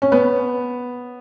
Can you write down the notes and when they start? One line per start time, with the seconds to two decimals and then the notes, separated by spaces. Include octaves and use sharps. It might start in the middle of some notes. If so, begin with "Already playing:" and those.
0.02 C#4
0.12 B3